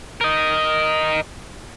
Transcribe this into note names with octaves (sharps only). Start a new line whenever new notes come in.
A#4 D#5